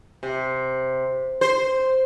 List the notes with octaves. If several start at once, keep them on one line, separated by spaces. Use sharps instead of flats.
C3
C5